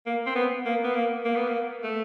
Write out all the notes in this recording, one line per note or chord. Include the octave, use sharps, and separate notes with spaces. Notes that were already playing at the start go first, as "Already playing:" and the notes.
A#3
C4
B3
A#3
B3
A#3
A#3
B3
A#3
A3